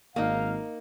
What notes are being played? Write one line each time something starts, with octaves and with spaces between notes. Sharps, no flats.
G#1 A#3 D#4 F5